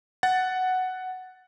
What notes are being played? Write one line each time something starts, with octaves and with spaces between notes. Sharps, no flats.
F#5 A6